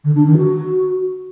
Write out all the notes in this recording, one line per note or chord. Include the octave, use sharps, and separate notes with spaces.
D3
D4
D#3
F#4